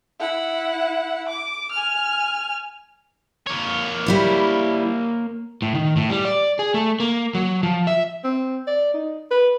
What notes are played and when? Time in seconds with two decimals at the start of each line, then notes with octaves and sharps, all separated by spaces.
0.20 E4 F#5
1.29 D6
1.72 G#5 F6
3.47 A#3 C#5
4.06 G3 E4 C5
5.62 A2
5.75 D#3
5.97 A2
6.10 G3
6.25 D5
6.59 G#4
6.74 A3
7.00 A#3
7.35 F#3
7.63 F3
7.87 E5
8.24 C4
8.67 D5
8.94 D#4
9.31 B4